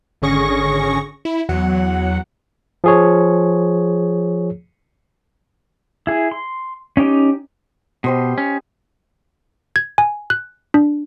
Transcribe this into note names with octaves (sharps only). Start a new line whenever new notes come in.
G#1 D3 C#4 G#4 C#6 A#6
E4
E2 F#3 F#5
F3 G#4 C#5
E4 G#4
C6
C#4 D#4 G4
B2 G4 C5 D#5
C#4
G#6
G#5
F#6
D4